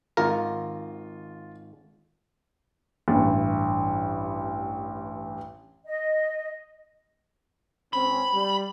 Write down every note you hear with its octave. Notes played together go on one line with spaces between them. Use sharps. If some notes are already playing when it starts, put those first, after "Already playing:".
G#1 F4 A#4
A1 G2
D#5
C#2 C4 C#4 B5
G3